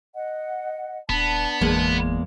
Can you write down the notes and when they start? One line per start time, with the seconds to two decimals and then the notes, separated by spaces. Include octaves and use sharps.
0.15 D#5 F#5
1.09 D#1 B3 D4 A5
1.61 G1 E2 G#3 A#3